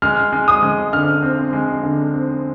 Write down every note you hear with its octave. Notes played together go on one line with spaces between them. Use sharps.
G#3 F6
G#3
D#6
G#3
D3 F6
C4
G#3
D3
C4